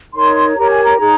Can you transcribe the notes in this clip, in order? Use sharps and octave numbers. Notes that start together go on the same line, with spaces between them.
D#4 A#4 C#5 C6
G4 A#4 C#5 A#5
G#5
A#5
D#4 G#4 C#5